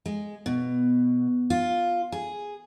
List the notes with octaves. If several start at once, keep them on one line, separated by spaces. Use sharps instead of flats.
G#3
B2
F4
G#4